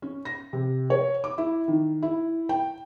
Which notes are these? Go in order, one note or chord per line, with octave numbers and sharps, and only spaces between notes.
C#4
A#6
C3
C#5
D6
E4
D#3
E4
G5